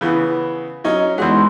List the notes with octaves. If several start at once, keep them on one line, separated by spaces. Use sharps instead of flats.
C#3 E3 B3
F#3 C#4 D#4
E2 G#3 D#4 F#4 C6